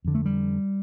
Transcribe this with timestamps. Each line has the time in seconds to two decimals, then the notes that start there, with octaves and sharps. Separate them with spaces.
0.05 F2 D3
0.15 A3
0.26 G3